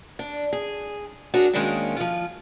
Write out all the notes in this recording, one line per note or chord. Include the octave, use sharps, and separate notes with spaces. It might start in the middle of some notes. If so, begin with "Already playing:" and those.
D4
G#4
D4 F#4 G#4 A#4 C#5
D#3 G#3 A#3 C#4 D4 A#4
F3 F4